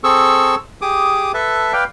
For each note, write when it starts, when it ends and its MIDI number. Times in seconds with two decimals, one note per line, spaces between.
0.04 0.55 60
0.04 0.55 68
0.04 0.55 69
0.04 0.55 85
0.04 0.55 88
0.82 1.32 67
0.82 1.32 68
0.82 1.32 86
0.82 1.32 87
1.34 1.73 69
1.34 1.73 71
1.34 1.73 76
1.34 1.73 81
1.73 1.84 71
1.73 1.84 74
1.73 1.84 77
1.73 1.84 79